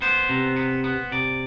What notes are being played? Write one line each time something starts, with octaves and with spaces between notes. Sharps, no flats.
B3 C5
C3
B3
B3
C3 D5